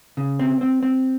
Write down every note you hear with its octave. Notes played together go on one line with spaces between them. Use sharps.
C#3
C4
C4
C4